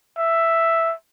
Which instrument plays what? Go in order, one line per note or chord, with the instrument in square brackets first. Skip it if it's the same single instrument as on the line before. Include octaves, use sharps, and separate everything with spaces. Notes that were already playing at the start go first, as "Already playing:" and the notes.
[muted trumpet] E5